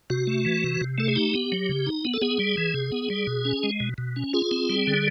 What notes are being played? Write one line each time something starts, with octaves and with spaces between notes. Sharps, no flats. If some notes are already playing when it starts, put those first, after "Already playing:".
C3 F#4
A3
E3
C3
C3
A3 A4
G#4
D#4 G4
B3
F#3
C#3
D#4
B3
A4
B3 G#4
G3
E3
C3
B3
G3
B2
C#4
G#3
B2
B2
C#4
F4 G#4
C4
G3
D3